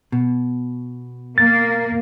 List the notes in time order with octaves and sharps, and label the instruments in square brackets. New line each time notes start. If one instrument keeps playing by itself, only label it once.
[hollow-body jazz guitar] B2
[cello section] A#3 [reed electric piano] A6